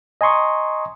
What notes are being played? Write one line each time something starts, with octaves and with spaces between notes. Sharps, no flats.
D#5 G#5 A#5 C6 C#6 D#6